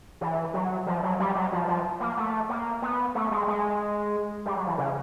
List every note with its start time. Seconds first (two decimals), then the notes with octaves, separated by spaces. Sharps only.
0.21 E3
0.54 F#3
0.87 F3
1.03 F#3
1.20 G3
1.35 F#3
1.52 F3
1.68 F3
2.00 A#3
2.17 A3
2.50 A#3
2.82 B3
3.15 A3
3.31 G#3
3.47 G#3
4.46 G3
4.56 F#3
4.67 E3
4.78 C#3